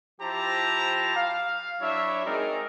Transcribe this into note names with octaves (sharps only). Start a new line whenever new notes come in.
F3 E4 G4 C5 A5 A#5
F5
F#3 D4 E4 C#5 E5
G#3 C4 D#4 G#4 A#4 D5